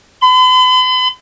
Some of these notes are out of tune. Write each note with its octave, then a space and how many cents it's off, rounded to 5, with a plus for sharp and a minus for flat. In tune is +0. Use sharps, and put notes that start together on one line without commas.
B5 +45